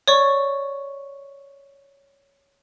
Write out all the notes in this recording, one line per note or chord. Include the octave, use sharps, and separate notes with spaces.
C#5 D5 C#6